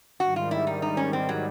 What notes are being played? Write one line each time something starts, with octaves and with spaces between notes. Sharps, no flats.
G#2 D#3 G3 F#4
F4
E4
D#4
D#4
C#4
C4
F#3